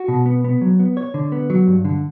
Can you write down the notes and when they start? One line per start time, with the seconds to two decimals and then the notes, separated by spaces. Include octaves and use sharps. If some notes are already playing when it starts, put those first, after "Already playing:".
Already playing: F#4
0.08 B2
0.26 B3
0.44 B3
0.61 F#3
0.80 B3
0.97 C#5
1.14 D3
1.32 B3
1.50 F#3
1.67 G2
1.85 D3